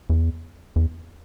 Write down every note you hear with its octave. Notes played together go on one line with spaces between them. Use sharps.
E2
E2